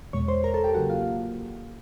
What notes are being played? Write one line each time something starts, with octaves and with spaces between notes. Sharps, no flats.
E2 B2 G#3 C#5 C#6
C5 C6
A#4 A#5
A4 A5
G4 G5
C#3 F#3 A#3 F#4 F#5
F4 F5